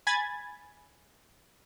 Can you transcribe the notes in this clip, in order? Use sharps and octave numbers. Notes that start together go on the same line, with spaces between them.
G#5 B5 G#6 A6